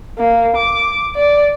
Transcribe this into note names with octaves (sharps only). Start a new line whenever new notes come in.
A#3
D6
D5